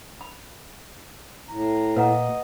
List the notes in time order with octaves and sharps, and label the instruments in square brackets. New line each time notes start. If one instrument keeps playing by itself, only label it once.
[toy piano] B5
[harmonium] A2 [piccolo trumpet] A#5
[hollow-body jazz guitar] A#2 [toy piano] B4 F#5 A#5 [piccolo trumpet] D#5